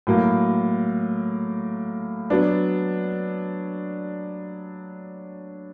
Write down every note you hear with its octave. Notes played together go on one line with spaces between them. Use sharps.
A2 F#3 A#3
F#3 B3 D4